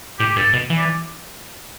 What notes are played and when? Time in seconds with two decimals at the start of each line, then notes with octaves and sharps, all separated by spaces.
0.19 A2 G4
0.30 G4
0.36 G2 A4
0.53 B2
0.70 E3
0.77 D5